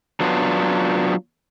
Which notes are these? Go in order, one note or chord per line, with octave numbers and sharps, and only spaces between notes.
F#3 B3 D4 F4